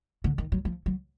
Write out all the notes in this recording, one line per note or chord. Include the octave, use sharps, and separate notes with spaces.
D3
D#3
F#3
F3
F#3